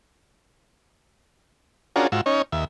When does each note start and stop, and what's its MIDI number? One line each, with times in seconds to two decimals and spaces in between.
1.96 2.07 61
1.96 2.07 62
1.96 2.07 65
1.96 2.07 66
1.96 2.07 68
1.96 2.07 70
2.12 2.21 44
2.12 2.21 65
2.12 2.21 66
2.12 2.21 88
2.26 2.42 61
2.26 2.42 63
2.26 2.42 73
2.52 2.65 39
2.52 2.65 76